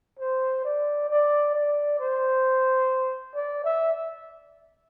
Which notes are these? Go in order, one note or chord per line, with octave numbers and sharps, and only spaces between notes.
C5
D5
D5
D5
C5
D5
E5